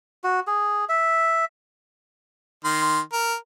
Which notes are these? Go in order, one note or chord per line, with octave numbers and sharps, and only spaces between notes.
F#4
G#4
E5
D#3 C6
A#4